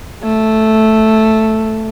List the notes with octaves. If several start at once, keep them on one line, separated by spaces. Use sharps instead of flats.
A3